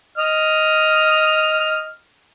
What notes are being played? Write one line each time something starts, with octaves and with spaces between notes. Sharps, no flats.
D#5 F6